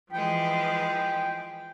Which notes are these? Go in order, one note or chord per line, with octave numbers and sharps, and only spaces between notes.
E3 F3 G#3 G5